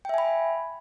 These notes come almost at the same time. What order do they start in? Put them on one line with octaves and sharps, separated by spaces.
G5 E5 G#5 B5